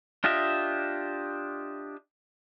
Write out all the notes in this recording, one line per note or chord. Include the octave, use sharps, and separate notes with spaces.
D4 F4 G4 D#5 E5